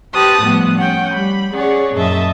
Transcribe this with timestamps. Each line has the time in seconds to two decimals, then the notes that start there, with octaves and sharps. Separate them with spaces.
0.12 G4 B4 C5 A5 D#6 F#6
0.42 A2 F3 G3 B3
0.78 C#4 F#5 G5
1.13 G3 B5
1.53 C#4 G#4 C#5 D5 F#5
1.94 F#2 A#2 D#5 E5 A5